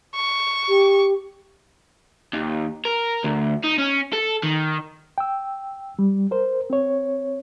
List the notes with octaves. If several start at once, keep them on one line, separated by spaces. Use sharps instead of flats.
C#6
G4
D#2
A#4
D2
D#4
C#4
A4
D#3
G5 E6
G3
A#4 C5
C4 C#5